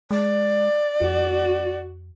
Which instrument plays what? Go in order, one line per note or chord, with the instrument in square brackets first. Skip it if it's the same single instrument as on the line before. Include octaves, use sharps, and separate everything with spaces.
[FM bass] G#3 [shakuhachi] D5
[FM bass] F2 [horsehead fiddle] F#4